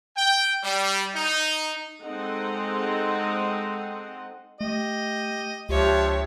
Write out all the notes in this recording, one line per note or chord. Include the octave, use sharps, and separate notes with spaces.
G5
G3
D#4
G#3 C4 D#4 A4 D#5 F#5
A3 G4 D#5
C#2 F3 D4 G4 C#5 E5